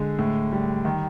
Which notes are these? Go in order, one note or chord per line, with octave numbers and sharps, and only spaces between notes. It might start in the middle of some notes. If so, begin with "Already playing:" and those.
Already playing: D3 G#3
A2
G3
D#3